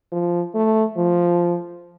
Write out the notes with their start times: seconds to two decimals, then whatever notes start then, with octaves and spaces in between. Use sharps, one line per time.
0.12 F3
0.54 A3
0.97 F3